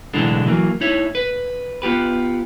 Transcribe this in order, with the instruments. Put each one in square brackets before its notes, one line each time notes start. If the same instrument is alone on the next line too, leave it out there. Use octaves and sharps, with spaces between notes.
[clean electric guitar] B1 A2 D3 E3 G#3 D4
E3 F#3 A#3
D#4 E4 C#5 E5
B4
B3 F4 G4 B4